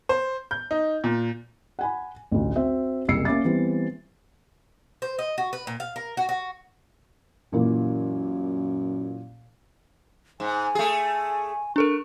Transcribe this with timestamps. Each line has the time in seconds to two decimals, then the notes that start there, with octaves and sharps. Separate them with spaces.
0.09 C5
0.51 G6
0.71 D#4
1.04 A#2
1.79 F#5 G#5 B5
2.32 A1 D2
2.56 C4 F#4 E5
3.08 F#1 C2 E6 C7 C#7
3.25 A#3 C#4 E5 D6 A6
3.45 E3 G3 B3 C4
5.02 C5
5.19 D#5
5.38 F#4
5.53 B4
5.67 A#2
5.80 F5
5.96 A#4
6.17 F#4
6.29 F#4
7.53 F#2 A#2 E3 A#3
10.40 G#2 G#5
10.75 A3 G#4
11.76 D4 A4 A#4 C#6